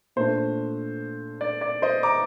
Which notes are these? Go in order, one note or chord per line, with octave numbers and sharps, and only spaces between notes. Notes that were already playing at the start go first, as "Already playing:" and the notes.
A#2 A3 D4 C5
D5
D5
C5 D#5
A#5 D6